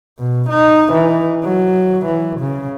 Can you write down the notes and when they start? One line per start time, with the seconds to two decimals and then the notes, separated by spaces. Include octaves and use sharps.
0.19 B2
0.50 D#4
0.93 E3
1.44 F#3
2.06 E3
2.40 C#3